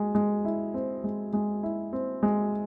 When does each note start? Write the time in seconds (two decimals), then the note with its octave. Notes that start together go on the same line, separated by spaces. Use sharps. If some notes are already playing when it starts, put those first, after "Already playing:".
Already playing: G#3
0.15 G#3
0.45 E4
0.74 C4
1.04 G#3
1.33 G#3
1.63 E4
1.93 C4
2.23 G#3